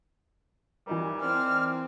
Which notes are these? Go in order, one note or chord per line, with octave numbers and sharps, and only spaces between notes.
E3 G3 D#4 A#4
C4 D5 F6